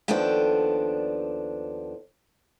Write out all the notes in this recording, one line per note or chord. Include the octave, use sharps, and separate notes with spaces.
D#2 F3 B3 D4 A4 G5